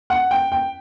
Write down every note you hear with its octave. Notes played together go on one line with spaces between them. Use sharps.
F#5
G5
G5